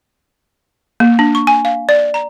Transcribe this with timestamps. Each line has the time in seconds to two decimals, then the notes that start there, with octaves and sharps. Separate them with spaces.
1.00 A#3
1.19 D4
1.35 C#6
1.47 G#5
1.65 F5
1.89 D5
2.14 A#5